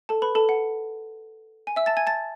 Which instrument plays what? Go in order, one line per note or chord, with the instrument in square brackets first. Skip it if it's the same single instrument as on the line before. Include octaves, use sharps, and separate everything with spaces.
[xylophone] A4 A5
B4 B5
A4 A5
F#5
G#5
E5 E6
A5 A6
G#5 G#6
A5 A6